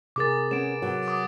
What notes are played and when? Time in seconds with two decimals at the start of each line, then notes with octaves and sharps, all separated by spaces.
0.16 C3 G#4 A#4 D6 A6
0.51 B3 C#4 D7 E7
0.82 F#3 B3
1.08 D6 D#6